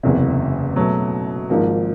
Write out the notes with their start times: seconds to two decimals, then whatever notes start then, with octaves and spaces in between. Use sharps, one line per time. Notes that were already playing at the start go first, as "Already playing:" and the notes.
0.03 F#1 E2 C3
0.76 B2 F#3 A3
1.50 G#1 G#2 F3 A#3